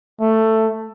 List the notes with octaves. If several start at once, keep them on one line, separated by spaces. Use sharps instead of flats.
A3